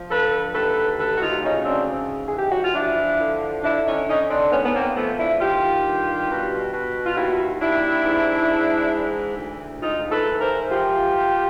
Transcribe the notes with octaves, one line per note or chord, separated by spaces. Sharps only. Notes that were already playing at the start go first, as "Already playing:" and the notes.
Already playing: F3
D3 A4 B4
D#2 A4 B4
D2 A4 B4
F#4
D#4 F4
C#3 C#4 D#4
C4 D4
G#2
G#4
E3
G4
F#4
F4
F3 D4 E4
D3
D3 D4 E4
C#4 D#4
D3 C#4 D#4
C4 D4
G#2 B3 C#4
B3
A#3 C4
F3 A3 B3
D4 E4
D#3 F4 G4
G2
B2
B2
F4
D#2 E4 F#4
D#2 D4 E4
G#2
G#2
E3
D2
G#2 D#4 F4
A4 B4
E3
A#4 C5
F3 F4 G4
F3